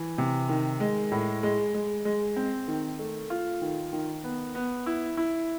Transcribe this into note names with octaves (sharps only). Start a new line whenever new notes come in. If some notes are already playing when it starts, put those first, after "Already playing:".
Already playing: E3
C3
D#3
G#3
A2
G#3
G#3
G#3
C4
D#3
A3
F4
D#3
D#3
B3
B3
E4
E4